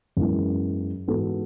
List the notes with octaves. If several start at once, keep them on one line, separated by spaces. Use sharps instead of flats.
F#2 E3 G#3 B3 E4
G#2 E3 B3 F#4 A4